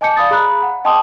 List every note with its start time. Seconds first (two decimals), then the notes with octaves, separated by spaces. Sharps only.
0.01 D#5 G#5 A5 D6 G6 C#7
0.16 D5 F5 B5 D#6 A6
0.31 G#4 A#5 B5 F#6
0.62 F#5
0.84 D#5 G5 A5 C6 D6 D#6